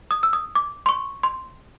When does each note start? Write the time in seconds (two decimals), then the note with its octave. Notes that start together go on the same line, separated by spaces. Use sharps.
0.11 D#6
0.23 E6
0.33 D#6
0.55 D6
0.86 C6
0.89 C#6
1.23 C6